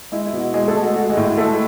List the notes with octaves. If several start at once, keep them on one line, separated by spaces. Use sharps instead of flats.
G#3 E4
E4
B2
F#4
G#3 G#4
A3 A4
G#3
F#4
G#3 F#4
G#3 G#4
A2
F#4
G#3 A3 A4